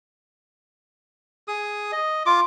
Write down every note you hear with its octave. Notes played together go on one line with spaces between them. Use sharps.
G#4 D#6
D#5
F4 D6